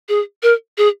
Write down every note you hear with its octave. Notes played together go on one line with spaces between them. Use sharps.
G#4
A#4
G#4